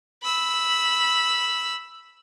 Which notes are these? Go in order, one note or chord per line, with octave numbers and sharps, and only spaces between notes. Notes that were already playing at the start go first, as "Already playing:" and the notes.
B5 E6